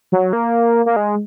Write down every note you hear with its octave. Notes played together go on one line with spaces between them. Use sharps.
F#3
A#3
A#3
G#3